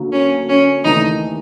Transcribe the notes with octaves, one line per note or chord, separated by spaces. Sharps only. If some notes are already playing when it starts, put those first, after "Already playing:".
Already playing: D2 D3 F#3 A#3
C#4
C#4
D#2 C#3 E3 A3 D4 D#4